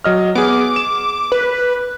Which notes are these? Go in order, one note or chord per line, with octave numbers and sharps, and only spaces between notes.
F#3 D#5 F6
B3 G#4 D6
E7
B4